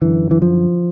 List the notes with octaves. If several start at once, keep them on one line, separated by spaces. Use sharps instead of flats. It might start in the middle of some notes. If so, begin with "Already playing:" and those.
F#2 D3 E3
E3
F3